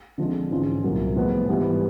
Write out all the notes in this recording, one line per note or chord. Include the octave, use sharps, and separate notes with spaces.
D3 F3 G#3 C4
G#2 E3 G#3 C#4 F4
C2 A#2 F#3 A#3
A2 F3 G#3 B3
G#2 E3 G3 B3